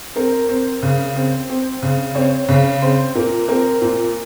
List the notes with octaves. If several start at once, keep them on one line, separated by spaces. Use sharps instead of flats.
C4 A#4
C4
C#3
C4
C4
C#3
C4 C#5
C#3
C4 C5
A#2 A#4
C4 A#4
A#2